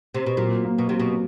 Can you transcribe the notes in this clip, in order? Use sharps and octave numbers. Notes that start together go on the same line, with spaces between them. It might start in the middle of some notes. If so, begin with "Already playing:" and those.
C3
B2
A#2 F#3
A#3
B2
C3 F#3
B2